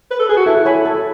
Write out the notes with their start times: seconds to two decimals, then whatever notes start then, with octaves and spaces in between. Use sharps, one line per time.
0.11 B4
0.19 A4
0.29 G#4
0.37 F#4
0.46 E4 A4
0.65 C#5 G#5 B5
0.85 A4